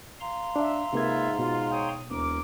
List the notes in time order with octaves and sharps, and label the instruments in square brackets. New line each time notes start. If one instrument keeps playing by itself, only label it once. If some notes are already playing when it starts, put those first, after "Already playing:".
[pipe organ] F5 A#5 C6
[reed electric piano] D4 [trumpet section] E5
[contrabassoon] G#2 [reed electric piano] C3 A#3 G#6 [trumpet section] F4 B4 E5
[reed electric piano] B2 [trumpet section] F4
[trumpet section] C#5 G5 D#6
[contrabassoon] E1 [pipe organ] D#2 [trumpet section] A#4 D6